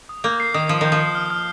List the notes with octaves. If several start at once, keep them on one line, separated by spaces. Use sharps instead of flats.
D#6
A#3 G6
C7
D#3 D#6
F3 D#6
D#3 G6
F3
C7
F6
F6